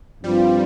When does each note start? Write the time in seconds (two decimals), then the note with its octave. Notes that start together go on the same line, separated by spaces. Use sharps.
0.24 G2 F3 G3 C4 F4